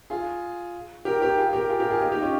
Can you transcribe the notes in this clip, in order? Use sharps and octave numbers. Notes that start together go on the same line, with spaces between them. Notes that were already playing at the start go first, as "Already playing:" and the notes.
F4 G#4
G4 A#4
G4 A#4
F4 G#4
G4 A#4
F4 G#4
G4 A#4
F4 G#4
D#4 G4
D#4 G4
C#4 F4